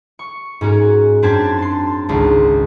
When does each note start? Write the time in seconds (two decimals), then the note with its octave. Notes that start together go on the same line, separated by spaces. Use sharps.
0.19 C#6
0.61 G#2 C#4 F#4 A#4
1.22 F#2 C4 D4 A5 G#6 B6
1.58 A5 C6
2.09 G#1 C#2